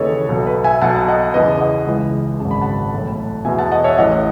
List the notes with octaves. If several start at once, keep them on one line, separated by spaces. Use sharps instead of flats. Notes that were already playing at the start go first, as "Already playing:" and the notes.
Already playing: D#2 C#3 E3 A4 B4 C#5 D#5
B1 B2 A4
B4
E5 G#5
B1 B2 F#5 A5
D#5 F#5
E2 C#3 E3 B4 D#5
D#5 F#5
C#2 C#3 E3
G#1 F#2 C#3 A5
B5
F#5 A5
B1 A2 E3
E2 B2 E5 G#5
F#5 A5
D#5 F#5
C#5 E5
A1 A2 E3 D#5 F#5